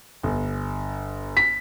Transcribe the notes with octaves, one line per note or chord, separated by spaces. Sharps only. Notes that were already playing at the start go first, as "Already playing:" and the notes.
G1
B6